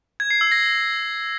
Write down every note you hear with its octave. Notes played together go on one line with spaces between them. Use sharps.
G#6
C7
E6
A#6